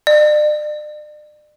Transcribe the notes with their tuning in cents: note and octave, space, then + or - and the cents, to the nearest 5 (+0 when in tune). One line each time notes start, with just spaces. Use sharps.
D5 +40